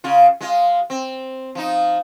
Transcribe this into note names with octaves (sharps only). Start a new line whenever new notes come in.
C#3 F4
G#3 F4
C4
F3 D#4